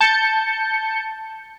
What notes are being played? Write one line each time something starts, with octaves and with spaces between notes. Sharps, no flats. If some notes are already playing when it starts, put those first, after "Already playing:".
A5 G6 C#7